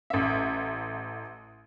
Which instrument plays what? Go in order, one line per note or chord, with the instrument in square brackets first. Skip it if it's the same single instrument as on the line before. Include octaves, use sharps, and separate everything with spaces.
[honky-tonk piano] A1 E5